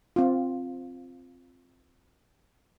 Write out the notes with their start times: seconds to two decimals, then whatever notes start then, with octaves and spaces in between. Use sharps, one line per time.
0.16 C4 F4